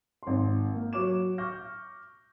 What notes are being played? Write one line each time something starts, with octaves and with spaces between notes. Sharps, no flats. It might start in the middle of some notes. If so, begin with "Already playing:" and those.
G#1 C6
A#3
F#3 C#5 D6 E7
C#6 D6 F6 G6 A#6